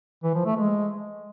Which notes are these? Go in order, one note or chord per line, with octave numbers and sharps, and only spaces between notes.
E3
F3
A3
G#3